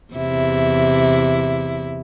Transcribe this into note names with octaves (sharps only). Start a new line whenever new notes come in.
E2 C3 E4